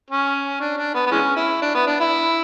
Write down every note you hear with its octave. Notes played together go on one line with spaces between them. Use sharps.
C#4
D4
D4
B3
B3
E3 G#3 C#4
E4
D4
B3
D4
E4